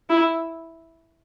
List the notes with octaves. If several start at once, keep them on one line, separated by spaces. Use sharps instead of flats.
E4